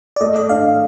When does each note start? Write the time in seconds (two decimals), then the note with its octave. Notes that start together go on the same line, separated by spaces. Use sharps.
0.16 D5
0.21 A3 D#5
0.36 D#5
0.49 D4 F5